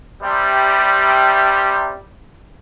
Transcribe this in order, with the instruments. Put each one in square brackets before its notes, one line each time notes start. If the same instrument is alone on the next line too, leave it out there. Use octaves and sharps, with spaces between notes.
[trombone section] C3 G3